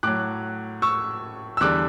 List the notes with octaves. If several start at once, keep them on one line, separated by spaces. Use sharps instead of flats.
A2 F#3 D6 F#6
C#6 E6
E6
E2 D3 G3 D6 F#6